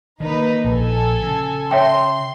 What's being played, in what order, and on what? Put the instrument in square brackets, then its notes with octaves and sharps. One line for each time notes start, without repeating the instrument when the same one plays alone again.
[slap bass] D#3 [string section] A#3 D#4 B4
[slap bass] A#1 [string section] A4 G#5
[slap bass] C#3
[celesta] C#5 E5 G5 [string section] C6